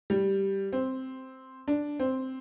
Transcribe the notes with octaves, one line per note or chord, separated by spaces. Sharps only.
G3
C4
D4
C4